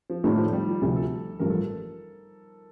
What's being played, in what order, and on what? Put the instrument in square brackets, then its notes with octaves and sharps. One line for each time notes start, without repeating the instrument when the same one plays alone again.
[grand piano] F3
[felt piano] A2 A3 D4 F4 [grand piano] D#3
[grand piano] F3
G3
F4
[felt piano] D2 C3 F3 [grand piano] A4
[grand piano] A4
[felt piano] A1 G2 F3 [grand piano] A#4
[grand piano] A4